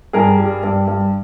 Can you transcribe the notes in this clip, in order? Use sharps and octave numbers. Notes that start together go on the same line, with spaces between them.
G2 G#4 A#4
G3
G2
G2